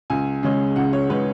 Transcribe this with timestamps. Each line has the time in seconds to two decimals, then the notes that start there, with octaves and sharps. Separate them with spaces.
0.10 C#2 G#5
0.43 C#3 G#3 C#4
0.76 C#2 F#5
0.93 C#5
1.09 C#3 G#3 C#4 B4